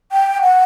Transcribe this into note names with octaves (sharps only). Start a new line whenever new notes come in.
G5
F#5